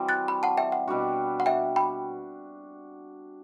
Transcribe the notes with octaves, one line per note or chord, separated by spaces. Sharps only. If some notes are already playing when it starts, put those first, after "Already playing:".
Already playing: E3 G3 C4 F#4
F#6 A6
G5 B5
F#5 A5
E5 G5
F#5
B2 G3 D4 F#4
F#5
E5 G5
G5 B5